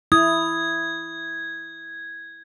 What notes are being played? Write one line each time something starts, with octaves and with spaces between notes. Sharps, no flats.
E4 D#6 G#6